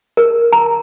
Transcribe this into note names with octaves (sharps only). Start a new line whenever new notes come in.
A#4
A#5